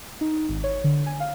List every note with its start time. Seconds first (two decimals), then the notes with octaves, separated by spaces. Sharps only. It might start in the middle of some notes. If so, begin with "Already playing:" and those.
0.21 D#4
0.49 G#1
0.64 C#5
0.84 D3
1.06 G#5
1.20 F5